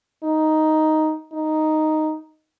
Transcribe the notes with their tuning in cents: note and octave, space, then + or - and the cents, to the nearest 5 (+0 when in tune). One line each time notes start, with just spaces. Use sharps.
D#4 +5
D#4 +0